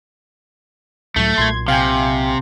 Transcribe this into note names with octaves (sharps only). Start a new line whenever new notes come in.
C#2 A2 F#3 A3
B1 A#2 C6 G#6
C3 F5 G5 G#5